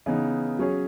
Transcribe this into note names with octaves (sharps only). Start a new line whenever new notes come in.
C#3 E3 B3 D#4
F#3 C#4 G#4 C#5